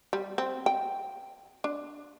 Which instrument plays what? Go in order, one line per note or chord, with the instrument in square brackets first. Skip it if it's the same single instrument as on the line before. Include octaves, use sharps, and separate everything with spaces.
[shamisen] G3
C4
G5
D4